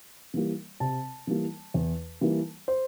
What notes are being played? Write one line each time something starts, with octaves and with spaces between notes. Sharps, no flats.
E3 G3 A#3
C3 A5
E3 G3 A#3
E2
E3 G3 A#3
C5